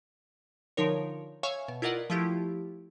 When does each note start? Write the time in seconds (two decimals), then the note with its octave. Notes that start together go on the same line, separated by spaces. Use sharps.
0.77 D3 F3 D#4 A#4 C#5
1.43 C#5 E5 F5 G#5 C#6
1.68 B2
1.82 E4 F4 A#4 D5 D#5 F#5
2.10 F3 A3 E4 F4 G4